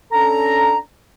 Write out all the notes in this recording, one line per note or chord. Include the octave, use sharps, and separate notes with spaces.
C#4 D4 A4 A#5